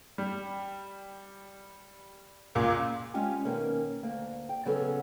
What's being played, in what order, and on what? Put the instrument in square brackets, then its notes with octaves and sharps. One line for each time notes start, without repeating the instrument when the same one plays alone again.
[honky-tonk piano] G3
C#2 A#2 D6
[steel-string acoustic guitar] G#3 C#4 F4 G4 G#5
B2 D#3 A#3 C#4
D2 A#3
G5
C#3 F#3 B3 C#4 G#4 A4